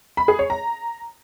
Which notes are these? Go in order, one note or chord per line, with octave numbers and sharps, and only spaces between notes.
B5
G#4
C#5
A#5